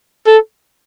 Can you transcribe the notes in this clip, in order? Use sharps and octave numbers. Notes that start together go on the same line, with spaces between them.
A4